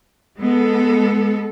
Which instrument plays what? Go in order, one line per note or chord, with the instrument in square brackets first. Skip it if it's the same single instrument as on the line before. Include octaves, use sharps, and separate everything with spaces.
[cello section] G#3 B3 A4